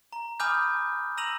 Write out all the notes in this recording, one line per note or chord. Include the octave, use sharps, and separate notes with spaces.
A#5
G#5 B5 D6 D#6 F6 G6
A#5 E6 A#6 D#7 F7 F#7